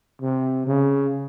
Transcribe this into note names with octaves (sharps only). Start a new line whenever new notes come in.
C3
C#3